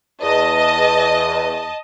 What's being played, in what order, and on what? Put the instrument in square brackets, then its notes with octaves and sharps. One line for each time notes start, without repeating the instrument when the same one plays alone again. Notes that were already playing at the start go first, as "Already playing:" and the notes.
[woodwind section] E2 [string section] D#5 [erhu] A5